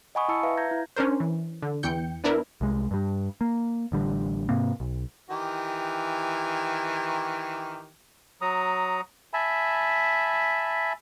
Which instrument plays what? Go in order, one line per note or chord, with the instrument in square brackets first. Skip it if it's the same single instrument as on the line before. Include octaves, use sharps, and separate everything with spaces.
[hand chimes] D#5 F#5 G#5 B5 C#6 D#6
E4 A5 E6 C#7
B4 E5 F5
A#5 G6 G#6 A#6
E4
[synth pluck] C#4 D4 A#4 C5
E3
D3
E2 E3 G5 G6 C#7
B3 D4 E4 A#4 B4
[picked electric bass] C2 G#3
G2 G3
A#3
A1 D3 G3
G#2 C3 A#3 C4
B1
[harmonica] D#3 E3 G4
[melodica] F#3 A#5 D#6
E5 G#5 A5 B5